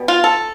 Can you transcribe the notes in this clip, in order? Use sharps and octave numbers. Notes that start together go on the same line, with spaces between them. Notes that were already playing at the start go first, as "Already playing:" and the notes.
Already playing: B2 G3 B3
F4
A4